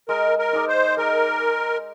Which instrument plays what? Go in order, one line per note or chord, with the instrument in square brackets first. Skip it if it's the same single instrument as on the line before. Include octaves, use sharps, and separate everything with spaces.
[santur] G#3 [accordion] A#4
[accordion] A#4
[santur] D#4 G#4 D5
[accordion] C5
[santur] G#3 [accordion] A#4